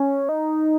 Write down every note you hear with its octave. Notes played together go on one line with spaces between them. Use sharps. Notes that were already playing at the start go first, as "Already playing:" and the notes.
Already playing: C#4
D#4